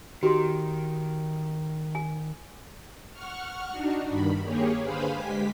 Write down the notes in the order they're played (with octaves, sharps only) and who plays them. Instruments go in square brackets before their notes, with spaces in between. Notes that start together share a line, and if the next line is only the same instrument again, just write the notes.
[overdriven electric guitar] D#3 [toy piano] F#4 G4 C6
[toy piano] G#5
[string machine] F#5 C#6 F6
D4 D#4 F#4
G2 D#3 B5
A#3 G4 G#4 C#5
D3 G#4 B4 C5 F5 B5
G#3 G4 B6